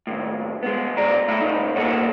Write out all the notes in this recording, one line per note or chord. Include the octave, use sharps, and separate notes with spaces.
D#2 A2
G#3 B3
D2 G#2 D5 A#5
A3 E4 E5 B5
A#2 F3 D#4
C2 G#2 A#3 A4 C#5 F#5